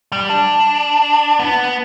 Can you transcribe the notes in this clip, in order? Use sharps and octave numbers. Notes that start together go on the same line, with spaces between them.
G3
D4
B3